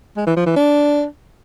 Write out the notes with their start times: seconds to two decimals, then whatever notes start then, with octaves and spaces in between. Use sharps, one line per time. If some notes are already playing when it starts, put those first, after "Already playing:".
0.17 G#3
0.27 E3
0.37 F3
0.46 E3
0.56 D4